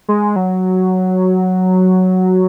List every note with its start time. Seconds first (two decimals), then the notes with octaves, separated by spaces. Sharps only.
0.08 G#3
0.36 F#3